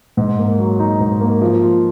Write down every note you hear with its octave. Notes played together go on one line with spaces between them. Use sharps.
G#2
A#3
F#3
D#4
G#2
A#3
F3
F4